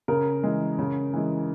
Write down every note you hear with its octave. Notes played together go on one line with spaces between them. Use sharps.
C#3 A#4
E3 G#3
C#3
E3 G#3